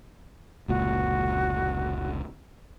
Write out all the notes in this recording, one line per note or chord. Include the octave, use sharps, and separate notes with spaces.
F1 C#2 A#2 F#4